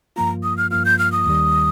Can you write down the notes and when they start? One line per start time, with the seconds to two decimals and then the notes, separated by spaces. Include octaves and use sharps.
0.16 G2 F3 A#3 F4 A#5
0.43 D#6
0.58 F6
0.71 G2 F3 A#3 F4 F6
0.85 G6
0.99 F6
1.12 D#6
1.26 D#2 D#3 G3